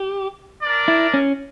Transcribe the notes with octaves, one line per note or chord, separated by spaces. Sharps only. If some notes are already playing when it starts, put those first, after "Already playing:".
Already playing: G4
D4 A#4 D5
E4
C#4